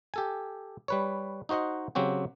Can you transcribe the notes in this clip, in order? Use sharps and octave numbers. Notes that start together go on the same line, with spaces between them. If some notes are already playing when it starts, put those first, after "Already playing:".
G4 A4 G#5
G3 B4 C#5
D#4 F#4 C5 D#5 F#5
C#3 F#3 C4 F#4 G4